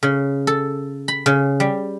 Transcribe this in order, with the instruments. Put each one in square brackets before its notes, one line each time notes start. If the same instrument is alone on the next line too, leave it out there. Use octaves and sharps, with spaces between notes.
[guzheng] C#3
A4
B5
C#3
G3